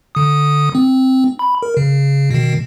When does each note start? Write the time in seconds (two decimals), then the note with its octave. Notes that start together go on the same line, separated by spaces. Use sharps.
0.15 D3 D#6
0.75 C4
1.39 B5
1.63 A#4
1.77 C#3
2.31 B2 D#3